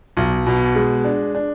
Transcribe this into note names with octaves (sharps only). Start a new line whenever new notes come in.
B1
B2
G#3
D4
D4